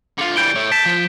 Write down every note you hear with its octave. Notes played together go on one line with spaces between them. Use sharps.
D3 F4
E3 G3 G6 D7 G7
A2
A5 B6 D7 E7
F3